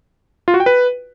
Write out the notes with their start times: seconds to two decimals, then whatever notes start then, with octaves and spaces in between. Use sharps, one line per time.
0.48 F4
0.54 F#4
0.60 G5
0.66 B4